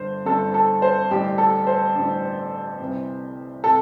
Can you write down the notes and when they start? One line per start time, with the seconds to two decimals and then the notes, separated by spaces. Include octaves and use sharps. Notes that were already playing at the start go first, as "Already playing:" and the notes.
Already playing: G1 G2 D3 C5
0.26 G1 G2 D3 A4
0.54 A4
0.82 C5
1.11 A1 G2 D3 G4
1.38 A4
1.67 C5
1.95 A1 G2 D3
2.80 C2 C3 E3
3.64 C3 A4